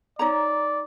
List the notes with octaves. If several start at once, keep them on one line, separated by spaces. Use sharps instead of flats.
D#4 C#5 D5 A#5